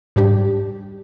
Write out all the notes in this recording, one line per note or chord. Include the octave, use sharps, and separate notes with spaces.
G#2 G3 D4 G4